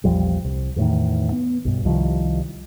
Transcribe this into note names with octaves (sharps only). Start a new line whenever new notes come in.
A#1 E2 F3 G3
C2
E2 A2 D#3
B3
B1 G2
C2 D#3 F3 G3